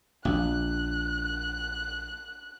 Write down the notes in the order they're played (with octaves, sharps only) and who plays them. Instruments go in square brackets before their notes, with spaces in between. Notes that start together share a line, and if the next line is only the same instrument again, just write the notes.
[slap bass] A#1 [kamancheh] F#6